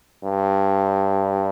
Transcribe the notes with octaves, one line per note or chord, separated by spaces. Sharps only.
G2